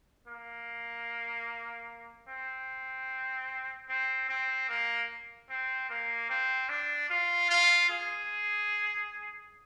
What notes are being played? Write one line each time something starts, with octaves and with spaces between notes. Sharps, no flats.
A#3
C4
C4
C4
A#3
C4
A#3
C4
D4
F4
F4
G#4